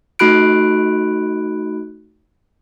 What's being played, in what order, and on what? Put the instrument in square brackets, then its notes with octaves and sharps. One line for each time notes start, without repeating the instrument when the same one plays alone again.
[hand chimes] A3 D#4 F#4 B5 F#6 D7